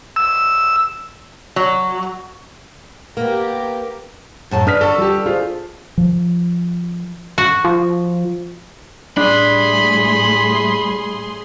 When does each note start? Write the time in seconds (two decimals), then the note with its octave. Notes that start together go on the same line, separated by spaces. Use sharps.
0.16 E6
1.56 F#3
3.17 A#3 B3 G4 A#4
4.51 F#2 A2 A5
4.67 D4 B4 D#6 F6 B6
4.81 F#4 A4
4.98 G3 G4
5.26 F4 G#4 C5
5.98 F3
7.38 F#4
7.65 F3
9.17 A2 G3 A3 D4 G#4 B5 C6